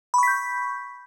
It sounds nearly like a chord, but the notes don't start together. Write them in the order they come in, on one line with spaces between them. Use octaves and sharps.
B5 C#6 B6 G6